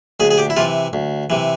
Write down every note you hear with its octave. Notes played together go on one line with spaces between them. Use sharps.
D2 G#4
G#4
G4
E4
C3 E3 F4
D2
C3 E3